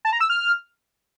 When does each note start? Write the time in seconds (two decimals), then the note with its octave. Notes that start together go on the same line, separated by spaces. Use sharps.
0.05 A5
0.13 A#5
0.20 E6
0.30 F6